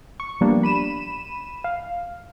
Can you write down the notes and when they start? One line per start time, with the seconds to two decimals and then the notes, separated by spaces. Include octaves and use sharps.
0.20 C#6
0.41 F3 G3 A#3 B3 D4
0.63 B5 D#7 E7
1.64 F5